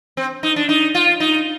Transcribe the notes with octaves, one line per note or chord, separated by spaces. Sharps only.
C4
D#4
D4
D#4
F4
D#4